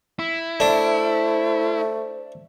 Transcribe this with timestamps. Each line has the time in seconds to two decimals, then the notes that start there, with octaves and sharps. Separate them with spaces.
0.19 E4
0.60 A3 D4 C5